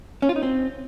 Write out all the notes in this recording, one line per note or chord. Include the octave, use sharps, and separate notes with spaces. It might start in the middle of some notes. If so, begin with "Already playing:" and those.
C#4
F4
D#4
C4